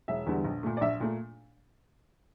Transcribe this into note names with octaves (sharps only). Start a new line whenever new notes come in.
E1 E5
E2 D3 G3
A#1
A#2 A3
D5
A#1 E5
A#2 A3